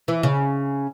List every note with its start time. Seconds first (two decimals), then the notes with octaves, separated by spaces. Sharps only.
0.08 E3
0.23 C#3